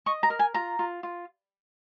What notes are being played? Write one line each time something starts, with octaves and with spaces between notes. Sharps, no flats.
D#5 C#6
A#5
A#4
G#5
F4 A#5
F4
F4